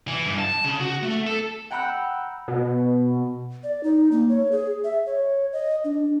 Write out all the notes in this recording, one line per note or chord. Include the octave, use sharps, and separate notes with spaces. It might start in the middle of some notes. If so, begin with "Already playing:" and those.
E3
G2
A5
C#3
F#4
A3
A4
F#5 G5 A#5 B5 E6 F#6
B2
D5
D#4
A#3
C#5
G#4
E5
C#5
D#5
D4